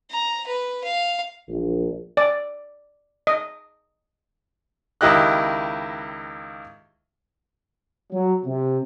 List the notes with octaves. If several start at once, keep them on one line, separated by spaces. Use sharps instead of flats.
A#5
B4
F5
A#1
D5
D#5
C#2 D#3 E4 G4 D#5 F#6
F#3
C3